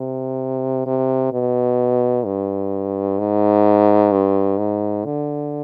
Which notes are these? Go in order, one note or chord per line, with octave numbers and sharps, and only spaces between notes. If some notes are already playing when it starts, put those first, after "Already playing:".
Already playing: C3
C3
B2
G2
G#2
G2
G#2
D3